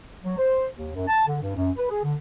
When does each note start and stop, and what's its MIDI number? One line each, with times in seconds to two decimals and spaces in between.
0.24 0.36 54
0.38 0.66 72
0.75 0.92 39
0.94 1.04 42
1.08 1.27 81
1.27 1.37 50
1.42 1.56 43
1.56 1.70 42
1.77 1.86 71
1.90 1.99 68
2.04 2.14 50